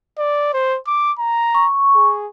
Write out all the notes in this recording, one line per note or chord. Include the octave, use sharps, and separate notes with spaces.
D5
C5
D6
A#5
C#6
G#4